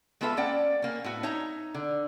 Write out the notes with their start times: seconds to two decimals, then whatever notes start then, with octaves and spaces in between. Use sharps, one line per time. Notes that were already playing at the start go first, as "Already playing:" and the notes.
0.21 G#3 B3 F4 A4 B4 E5
0.37 A#3 C#4 D5 F#5 G5
0.82 A#3 C#4
1.04 A2 B3 F#4
1.23 D#4 C#5 E5 A#5
1.75 D3